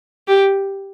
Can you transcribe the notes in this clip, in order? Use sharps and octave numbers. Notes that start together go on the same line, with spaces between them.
G4